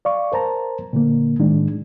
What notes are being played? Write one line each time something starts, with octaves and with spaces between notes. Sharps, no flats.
D5 F5 C#6
A#4 C5 A5 A#5
A#2 D3 A#3
A2 D#3 G#3 D4